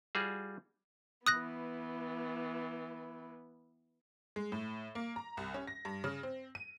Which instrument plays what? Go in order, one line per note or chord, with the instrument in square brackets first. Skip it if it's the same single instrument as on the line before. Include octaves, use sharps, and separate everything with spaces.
[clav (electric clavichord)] G3 F4 F#4 G#4
[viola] E3 B3 [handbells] D#6 F#6 A#6
[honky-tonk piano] G#3
A2
A#3
A#5
C2
C#4
A#6
G2
C#3
C4
D#7